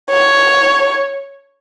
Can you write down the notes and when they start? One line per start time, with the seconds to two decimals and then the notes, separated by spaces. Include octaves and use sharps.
0.11 C#5